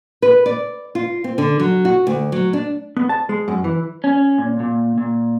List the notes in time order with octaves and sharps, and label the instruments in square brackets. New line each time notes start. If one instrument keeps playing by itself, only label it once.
[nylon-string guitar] B4
D5
F4
C4
D3
F#3
F#4
D2
F#3
D4
[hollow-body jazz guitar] B3
A5
G#3
F#2
E3
[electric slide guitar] C#4
A#2
A#2
A#2